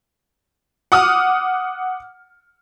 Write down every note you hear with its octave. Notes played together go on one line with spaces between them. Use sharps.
F#5 D6 D#6 F6